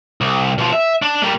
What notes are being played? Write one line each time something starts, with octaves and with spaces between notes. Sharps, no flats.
C2
B2 F3
E5
D4
G3 A#3